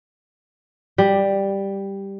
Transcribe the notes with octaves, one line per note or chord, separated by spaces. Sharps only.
G3